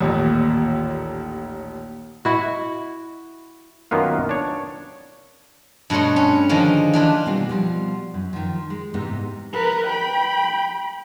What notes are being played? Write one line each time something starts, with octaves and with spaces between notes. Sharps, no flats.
A1 D#2 A#2
E4 F#4
F#2 D#3 A#3 B3 F4
D4 C#5
G2 B2 A3 C#5 C6
C#4
D3 D#3 F3 G#3
E3 D4 F4
B2 D#3 G3 C4 F4
B2 F3 G3
F#2
D#3 F3
G#3
G#2 C3 E3 B3 D#4
A#4 B4
G5 B5